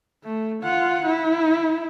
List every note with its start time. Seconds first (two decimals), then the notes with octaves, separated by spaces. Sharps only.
0.24 A3
0.63 F4 F#5
1.06 E4